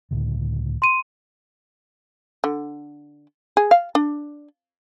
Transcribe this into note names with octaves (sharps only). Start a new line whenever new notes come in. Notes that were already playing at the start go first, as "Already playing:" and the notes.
C#2 A2 D3
C6 D#7
D3
G#4
F5
D4